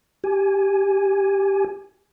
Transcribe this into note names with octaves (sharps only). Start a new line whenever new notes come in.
G4 G#5